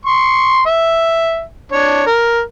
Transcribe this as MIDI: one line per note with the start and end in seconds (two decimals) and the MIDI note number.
0.06 0.62 84
0.06 0.62 85
0.66 1.42 76
1.72 2.03 62
1.72 2.03 73
2.07 2.41 70